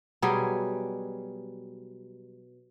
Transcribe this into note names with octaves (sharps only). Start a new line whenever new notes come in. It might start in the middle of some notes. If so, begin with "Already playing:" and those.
B2 F#3 G3 G#4